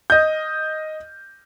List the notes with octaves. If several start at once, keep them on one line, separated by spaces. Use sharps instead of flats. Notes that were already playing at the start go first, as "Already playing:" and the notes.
D#5 G6